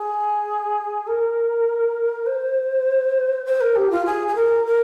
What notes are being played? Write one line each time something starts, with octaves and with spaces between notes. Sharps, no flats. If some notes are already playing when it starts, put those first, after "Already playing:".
Already playing: G#4
A#4
C5
C5
A#4
G4
F4
G#4
G#4
A#4
A#4